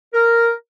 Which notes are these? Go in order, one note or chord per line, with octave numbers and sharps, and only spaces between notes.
A#4